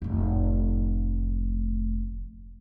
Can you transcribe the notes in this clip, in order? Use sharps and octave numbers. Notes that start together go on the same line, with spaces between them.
F1 A2